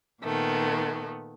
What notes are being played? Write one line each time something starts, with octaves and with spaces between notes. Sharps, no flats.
A#2 D#3 A3 B3